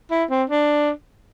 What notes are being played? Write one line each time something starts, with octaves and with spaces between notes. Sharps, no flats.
E4
C4
D4